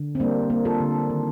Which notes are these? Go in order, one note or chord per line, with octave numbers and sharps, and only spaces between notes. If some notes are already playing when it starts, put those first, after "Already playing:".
Already playing: D3
C4
G3 A#3 D4
A#3
F4 A4
D3
D#3